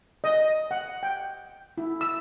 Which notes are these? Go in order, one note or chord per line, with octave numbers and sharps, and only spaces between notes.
D#5
F#5
G5
E4
E6